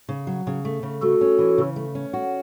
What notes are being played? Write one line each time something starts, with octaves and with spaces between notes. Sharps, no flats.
C#3
F#3
C#3
A3
C#3
A3 F#4 A4
C#4
E3
C#3
A3
C#4
F#4